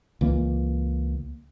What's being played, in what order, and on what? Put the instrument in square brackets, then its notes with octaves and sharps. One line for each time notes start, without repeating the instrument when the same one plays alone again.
[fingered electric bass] C#2 E3 A#3